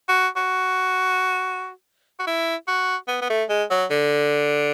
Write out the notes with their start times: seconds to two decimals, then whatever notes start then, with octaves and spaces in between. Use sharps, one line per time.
0.09 F#4
0.36 F#4
2.19 F#4
2.27 E4
2.68 F#4
3.08 B3
3.21 B3
3.30 A3
3.49 G#3
3.70 F#3
3.90 D3